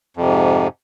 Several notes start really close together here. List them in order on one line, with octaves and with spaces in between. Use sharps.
F2 C3 G#2